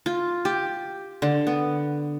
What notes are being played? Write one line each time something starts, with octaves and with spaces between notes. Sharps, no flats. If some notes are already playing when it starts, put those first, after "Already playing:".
F4
G4
D3
B3